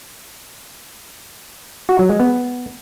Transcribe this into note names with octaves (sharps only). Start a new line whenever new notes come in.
F#4
F#3
G#3
B3